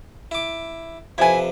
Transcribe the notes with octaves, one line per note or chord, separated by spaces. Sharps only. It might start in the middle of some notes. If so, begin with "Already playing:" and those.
E4 D6
F2 C3 E4 B4 G#5